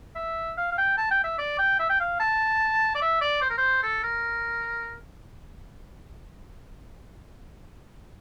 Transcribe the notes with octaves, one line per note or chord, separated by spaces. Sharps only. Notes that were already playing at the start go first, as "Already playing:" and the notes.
E5
F5
F5
G5
A5
G5
E5
D5
G5
E5
G5
F5
A5
D5
E5
D5
C5
A#4
C5
A4
A#4